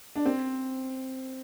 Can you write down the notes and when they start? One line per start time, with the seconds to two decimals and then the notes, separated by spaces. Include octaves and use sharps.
0.16 D4
0.26 C4